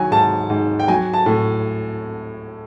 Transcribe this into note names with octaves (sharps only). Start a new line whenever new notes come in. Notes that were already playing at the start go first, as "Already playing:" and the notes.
Already playing: D#3 F#3 G#5
G#2 A5
G#2
G5
F#3 G#5
A5
A2